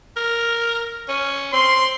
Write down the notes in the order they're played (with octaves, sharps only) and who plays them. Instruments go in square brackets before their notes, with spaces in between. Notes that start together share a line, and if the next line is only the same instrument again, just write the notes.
[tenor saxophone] A#4
C#4
[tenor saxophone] C4 [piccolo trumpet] C6